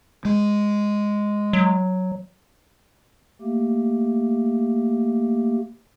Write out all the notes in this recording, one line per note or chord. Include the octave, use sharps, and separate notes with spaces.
G#3
F#3
A3 A#3 G4